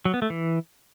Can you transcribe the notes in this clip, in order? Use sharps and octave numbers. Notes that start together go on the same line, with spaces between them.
F#3
B3
A3
E3